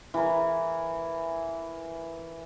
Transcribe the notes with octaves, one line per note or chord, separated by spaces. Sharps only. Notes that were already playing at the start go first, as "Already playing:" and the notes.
E3 A#4